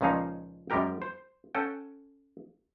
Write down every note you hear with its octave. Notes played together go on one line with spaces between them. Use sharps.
C#2 A#2 F3 C#4 D#4 F5
F#2 G3 G#3 G4 A#4 G5
C5
C#4 A4 F#5 G5